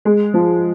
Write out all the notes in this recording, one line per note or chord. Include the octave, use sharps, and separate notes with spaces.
G#3
F3